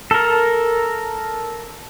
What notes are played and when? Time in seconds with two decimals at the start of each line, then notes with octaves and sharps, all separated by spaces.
0.11 A4 A#4